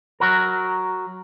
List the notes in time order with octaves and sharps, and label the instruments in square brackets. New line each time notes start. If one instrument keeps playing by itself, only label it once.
[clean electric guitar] F#3 F#4 A#4